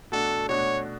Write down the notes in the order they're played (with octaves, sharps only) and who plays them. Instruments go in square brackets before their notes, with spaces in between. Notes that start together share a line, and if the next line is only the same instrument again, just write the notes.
[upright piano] B2 A3 D4 F#4 [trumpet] A4
[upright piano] B2 A3 D4 F#4 [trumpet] C#5